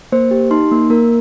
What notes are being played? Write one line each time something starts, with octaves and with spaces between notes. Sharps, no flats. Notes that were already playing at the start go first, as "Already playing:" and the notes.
A#3 C5
G4
D#4 C6
A#3
A#3 A#4